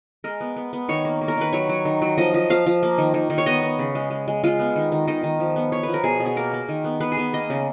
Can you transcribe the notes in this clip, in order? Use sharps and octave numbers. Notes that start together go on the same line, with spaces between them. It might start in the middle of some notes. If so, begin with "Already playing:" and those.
G#3 A#4
B3
B3
B3
D#3 C#5
A#3
A#3
A#4
D#3 B4
F#3 C#5
F#3
D#3
F#3
F3 D#5
F3
F3 F5
F3
A#3
D#3
D#3
D#3
C#5
B3 D#5
B3
C#3
G#3
G#3
G#3
G#3 F4
B3
D#3
D#3
D#3 D#5
D#3
F3
B3
B3 C#5
B4
F3
A#4
B2 G#4
B2
G#4
A#3 A#4
A#3
D#3
B3
B3 B4
G#4
B3
A#3 D#5
C#3